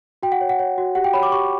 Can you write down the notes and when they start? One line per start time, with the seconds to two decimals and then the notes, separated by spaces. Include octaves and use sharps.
0.23 F#4 G5
0.32 F#5
0.41 C#5
0.49 F#5
0.59 C#5
0.78 F#4
0.95 G4 F#5
1.04 G5
1.14 C#5 B5
1.23 D6
1.32 G4 C#6